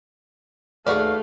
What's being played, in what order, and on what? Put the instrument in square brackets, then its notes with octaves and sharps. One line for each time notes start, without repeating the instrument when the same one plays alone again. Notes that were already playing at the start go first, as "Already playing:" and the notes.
[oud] D#2 G#4 [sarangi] A3 [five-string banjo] F#4 B4 D5 [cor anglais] F5